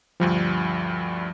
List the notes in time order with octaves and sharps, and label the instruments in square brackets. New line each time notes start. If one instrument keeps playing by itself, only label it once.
[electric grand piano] D2 G2 G3 [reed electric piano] F3